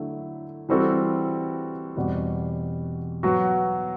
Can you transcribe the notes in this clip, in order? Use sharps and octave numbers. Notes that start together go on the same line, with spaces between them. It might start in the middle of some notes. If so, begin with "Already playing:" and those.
Already playing: D3 F#3 A3 E4
E3 G3 C4 F#4 A4
E2 B2 G3 C4 F#4
F#3 B3 F#4